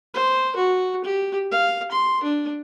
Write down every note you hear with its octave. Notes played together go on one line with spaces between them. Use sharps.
C5
F#4
G4
F5
C6
D4